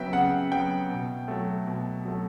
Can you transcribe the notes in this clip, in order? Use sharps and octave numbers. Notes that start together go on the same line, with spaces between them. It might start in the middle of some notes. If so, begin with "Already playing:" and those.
Already playing: C#3 F#3 B3 E5 G5
C#3 F#5
F#3 B3 G5
B2
F#3 A3
B2
F#3 A3